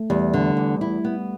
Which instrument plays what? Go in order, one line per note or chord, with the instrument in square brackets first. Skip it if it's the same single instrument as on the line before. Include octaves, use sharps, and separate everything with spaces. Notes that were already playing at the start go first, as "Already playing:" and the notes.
Already playing: [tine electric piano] A3
[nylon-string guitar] E2 [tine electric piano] G3
[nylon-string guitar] D3
E2
E4
B3